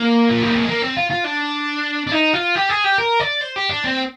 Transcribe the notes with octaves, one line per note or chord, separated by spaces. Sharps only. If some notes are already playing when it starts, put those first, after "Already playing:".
Already playing: A#3
F3
G3
G#3
A#3
C4
F4
F4
D4
D4
D#4
F4
G4
G#4
G4
A#4
D5
C5
G4
D4
C4